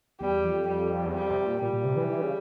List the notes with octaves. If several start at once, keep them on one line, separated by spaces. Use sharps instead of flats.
E2 G3
F2
G3
E2
F2 G3
C3
C3
A#2
A#2 G3
A#2
C3
E3
E3
C#3